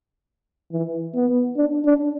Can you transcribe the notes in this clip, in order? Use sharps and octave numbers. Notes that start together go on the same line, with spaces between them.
E3
B3
D4
D4